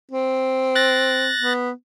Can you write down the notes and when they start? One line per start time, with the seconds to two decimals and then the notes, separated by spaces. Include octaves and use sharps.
0.11 C4
0.75 F#6 A6 A#6
1.41 B3